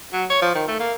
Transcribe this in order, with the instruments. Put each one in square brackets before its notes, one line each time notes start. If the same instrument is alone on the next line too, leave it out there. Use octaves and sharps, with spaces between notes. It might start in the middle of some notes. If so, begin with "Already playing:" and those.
[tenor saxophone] F#3
C#5
F3
D#3
A3
A#3